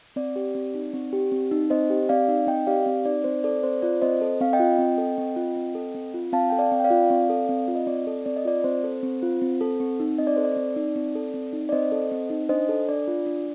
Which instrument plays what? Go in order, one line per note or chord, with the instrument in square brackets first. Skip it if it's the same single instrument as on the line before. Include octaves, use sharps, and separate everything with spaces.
[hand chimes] C4 D5
G4
C4
D#4
C4
G4
C4
D#4
C4 C5 D#5
G4
C4 D5 F5
D#4
C4 D#5 G5
G4 D5 F5
C4
D#4 D5
C4 C5
A4 D5
C4 C5
F4 D5
C4 C5 D#5
A4
C4 F5
D#5 G5
F4
C4
A4
C4
F4
C4
A4
C4
F4
C4 F5 A5
A4 G5
D5 F5
C4
G5
D5 F5
F4
C4
A4
C4
F4
D#5
C4 D5
A4
C4 D5
D#5
F4 D5
C4 C5
A4
C4
F4
C4
A4
C4
D#4
C4 D#5
D5
A4 C5
D5
C4
D#4
C4
A4
C4
D#4
D5
C4 C5 D#5
A4
C4
D#4
D4 C5 D#5
A4
D4 D5
F4
D4